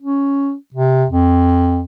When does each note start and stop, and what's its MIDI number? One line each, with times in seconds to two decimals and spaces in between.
0.02 0.54 61
0.74 1.05 48
1.10 1.82 41